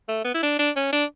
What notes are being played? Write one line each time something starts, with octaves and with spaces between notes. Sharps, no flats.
A3
B3
E4
D4
D4
C#4
D4